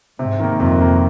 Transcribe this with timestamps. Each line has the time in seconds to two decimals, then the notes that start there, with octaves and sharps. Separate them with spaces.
0.19 G#2 C3
0.40 D#3 A#3
0.60 F2 C3
0.81 D#3 A#3